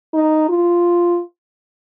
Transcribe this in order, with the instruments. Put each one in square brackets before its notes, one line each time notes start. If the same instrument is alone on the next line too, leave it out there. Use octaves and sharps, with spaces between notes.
[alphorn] D#4
F4